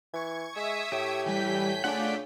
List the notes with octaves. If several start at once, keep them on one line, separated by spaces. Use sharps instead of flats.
E3 C#6 G#6
G#3 E5 D#6
A2 G4
E3 G3 G#5 G6 B6
C#3 A3 D4 F4 D5 F#5